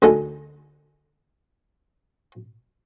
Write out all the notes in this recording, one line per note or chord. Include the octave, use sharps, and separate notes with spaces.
D2 D3 G#3 D#4 A4